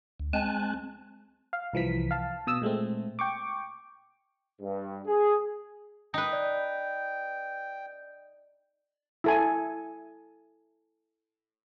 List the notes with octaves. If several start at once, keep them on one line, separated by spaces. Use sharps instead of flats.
D2
G#3 C4 G#5 A5 F#6
F5
C2 E3 F3 B6
F5 A5
B2 D#6 E6
A#2 G#3 A3 C4
G5 C#6 D6
G2
G#4
D#4 B4 G5
D5
E4 A4 G#5